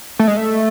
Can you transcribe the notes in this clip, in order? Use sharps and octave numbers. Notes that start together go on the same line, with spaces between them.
A3
G#3
A3